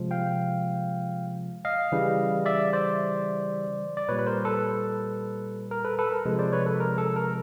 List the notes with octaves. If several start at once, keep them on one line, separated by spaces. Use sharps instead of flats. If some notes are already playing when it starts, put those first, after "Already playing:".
Already playing: C3 F3 G#3
F5 G5
D#5 F5
C#3 E3 G3
D5 E5
C5 D5
D5
A#2 G3 B4 C#5
B4
A#4 C5
A4 B4
A#4
A4 B4
A4 B4
A#4
C3 F3 G#3 A4
C5 D5
B4 C#5
A4 B4
A#4
A4
A#4